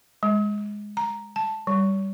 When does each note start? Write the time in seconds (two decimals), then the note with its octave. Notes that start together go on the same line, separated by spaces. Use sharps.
0.23 G#3
0.97 A#5
1.36 A5
1.67 G3